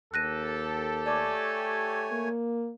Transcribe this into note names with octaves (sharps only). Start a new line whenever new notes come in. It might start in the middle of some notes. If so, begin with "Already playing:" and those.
D#2 G4 A4 F#6 A#6 D#7
A3 C#5 D5 G#5 A5 D6
A#3